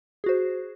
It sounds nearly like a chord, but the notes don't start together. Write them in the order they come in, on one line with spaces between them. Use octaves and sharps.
G#4 F#4 C5